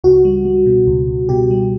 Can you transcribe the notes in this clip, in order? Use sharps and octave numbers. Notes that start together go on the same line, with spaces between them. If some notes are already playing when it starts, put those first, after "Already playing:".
C#2 F#4
G3
G3
B2
C#2
C#2
B2 G4
G3